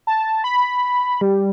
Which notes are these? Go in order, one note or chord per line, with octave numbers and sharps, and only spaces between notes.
A5
B5
G3